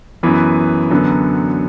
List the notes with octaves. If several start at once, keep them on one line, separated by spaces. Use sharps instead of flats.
F#2 E3 B3
F#2 D3 F#3 B3